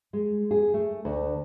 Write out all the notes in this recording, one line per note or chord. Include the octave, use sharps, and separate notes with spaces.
G#3
G#4
A3
D2